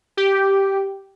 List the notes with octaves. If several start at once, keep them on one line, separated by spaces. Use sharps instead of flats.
G4